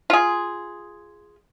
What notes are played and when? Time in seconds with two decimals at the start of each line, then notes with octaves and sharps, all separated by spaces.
0.10 F4 G#4